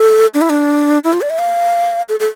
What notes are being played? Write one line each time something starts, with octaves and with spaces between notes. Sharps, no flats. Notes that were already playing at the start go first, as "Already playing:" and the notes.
Already playing: A4
D4
E4
D4
E4
F4
D5
E5
F5
A4
A4